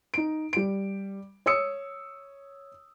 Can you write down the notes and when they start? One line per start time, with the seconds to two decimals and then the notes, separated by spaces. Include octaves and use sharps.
0.14 D#4 D7
0.53 G3 D7
1.46 C#5 D#6 E6 C#7